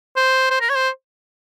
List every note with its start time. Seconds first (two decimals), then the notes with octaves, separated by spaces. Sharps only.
0.16 C5
0.50 C5
0.61 A#4
0.70 C#5
0.75 C5